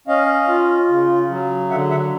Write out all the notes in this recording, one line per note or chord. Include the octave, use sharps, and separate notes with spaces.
C#4 D#5 F5
F4
C#3
F#3
D3 E5 F#5
E5 F#5